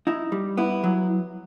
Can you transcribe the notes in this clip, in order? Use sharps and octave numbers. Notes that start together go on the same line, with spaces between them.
D#4 E4
G3
B3 E4
F#3